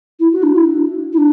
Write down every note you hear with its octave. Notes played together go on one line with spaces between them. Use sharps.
E4
F#4
D4
E4
E4
D4